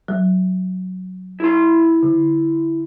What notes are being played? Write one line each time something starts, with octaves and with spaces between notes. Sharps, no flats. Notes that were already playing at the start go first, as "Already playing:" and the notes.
F#3
E4 C6
D3